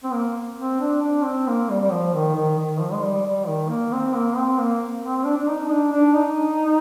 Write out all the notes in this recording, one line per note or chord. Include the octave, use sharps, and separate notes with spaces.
C4
A#3
C4
D4
D4
C4
A#3
G3
G3
F3
D#3
D#3
D#3
F3
G#3
G3
G3
D#3
A#3
C4
A#3
C4
A#3
C4
D4
D4
D#4
D4
D4
D#4